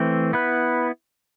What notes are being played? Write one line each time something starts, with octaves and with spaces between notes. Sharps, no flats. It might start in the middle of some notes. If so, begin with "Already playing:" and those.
Already playing: E3 A3 C4
B3 E4 B4